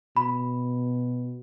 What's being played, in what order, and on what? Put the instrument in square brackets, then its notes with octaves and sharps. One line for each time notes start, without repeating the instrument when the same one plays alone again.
[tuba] B2 [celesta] B5